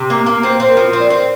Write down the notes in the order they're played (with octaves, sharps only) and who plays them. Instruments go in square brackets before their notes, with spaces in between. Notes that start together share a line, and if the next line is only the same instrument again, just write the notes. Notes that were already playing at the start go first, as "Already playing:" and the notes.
Already playing: [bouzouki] C3
A#3
A#3
[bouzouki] C4 [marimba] C5
[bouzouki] C4 [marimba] C5
[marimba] A#4
[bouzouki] F3 [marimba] C5
[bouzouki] C4
[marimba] D5
[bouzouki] C4 [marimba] C5